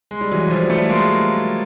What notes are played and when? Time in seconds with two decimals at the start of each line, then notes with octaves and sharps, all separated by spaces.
0.11 G#3
0.21 G3
0.31 E3 F#3
0.50 F3 G3
0.70 G3 A3
0.90 G#3 A#3